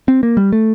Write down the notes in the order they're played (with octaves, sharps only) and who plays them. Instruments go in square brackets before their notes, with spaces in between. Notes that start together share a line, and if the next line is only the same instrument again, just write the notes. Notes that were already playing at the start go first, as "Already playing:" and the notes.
[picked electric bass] C4
A#3
G3
A3